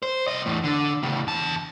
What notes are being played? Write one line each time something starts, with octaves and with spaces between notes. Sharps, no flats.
C5
C2 D#5
E2 A2
D3
A2 C#3
E2 A5